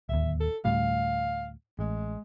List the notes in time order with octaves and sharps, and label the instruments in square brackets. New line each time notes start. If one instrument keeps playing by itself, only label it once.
[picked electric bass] D1 D#2 [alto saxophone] E5
[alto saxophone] A4
[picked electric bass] D2 A2 G3 [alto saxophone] F5
[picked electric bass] A1 [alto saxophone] G#3